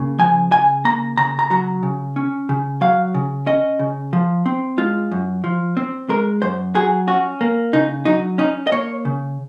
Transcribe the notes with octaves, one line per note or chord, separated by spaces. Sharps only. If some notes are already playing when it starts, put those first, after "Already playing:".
Already playing: C#3 A#3
F3 G#5
C#3 G#5
A#3 A#5
C#3 A#5
A#5
F#3 A#5
C#3
C#4
C#3
F#3 F5
C#3
C#4 D#5
C#3
F3
C4
G#3 F4
F#2
F3
C4
G#3 A#4
F#2 C5
F#3 G#4
C#4 F#4
A#3
C#3 D#4
F#3 D#4
C#4 D#4
D#5
A#3 C#5
C#3